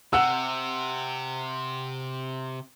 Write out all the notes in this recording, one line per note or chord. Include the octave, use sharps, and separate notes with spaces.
C3 F#5 E6